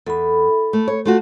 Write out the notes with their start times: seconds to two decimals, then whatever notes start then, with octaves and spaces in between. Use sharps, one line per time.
0.07 E2 A4 B5
0.73 A3
0.88 C#5
1.06 A3 F4 F#4